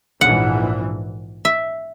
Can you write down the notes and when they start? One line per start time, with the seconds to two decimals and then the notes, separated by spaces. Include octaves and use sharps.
0.21 A#1 G#2 E3 F#5
1.45 E5